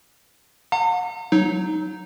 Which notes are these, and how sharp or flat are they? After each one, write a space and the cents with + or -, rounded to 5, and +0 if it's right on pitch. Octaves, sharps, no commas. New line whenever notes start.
F#5 -40 A#5 -45
F#3 +0 D#4 +0